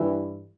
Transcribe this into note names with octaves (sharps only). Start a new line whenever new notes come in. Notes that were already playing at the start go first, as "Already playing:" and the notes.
Already playing: G2 E3